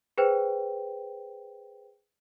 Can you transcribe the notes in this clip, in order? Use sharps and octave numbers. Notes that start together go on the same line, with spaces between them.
G#4 B4 C5 G5